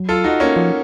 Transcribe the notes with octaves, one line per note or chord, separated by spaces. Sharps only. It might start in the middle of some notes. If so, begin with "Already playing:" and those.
Already playing: F#3
F4 A4
D#4 F#4
A#3 C#4
F3